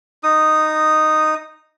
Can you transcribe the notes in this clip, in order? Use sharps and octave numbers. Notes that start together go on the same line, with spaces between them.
D#4 D#6